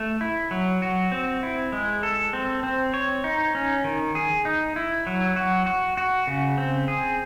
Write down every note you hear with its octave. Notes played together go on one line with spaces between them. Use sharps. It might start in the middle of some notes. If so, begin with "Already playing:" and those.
Already playing: A3
E4
F#3
F#4
C4
E4
G#3
A4
C4
C4
C#5
D#4
C#4
D#3
G#4
D#4
E4
F#3
F#4
F#4
F#4
C#3
C4
G#4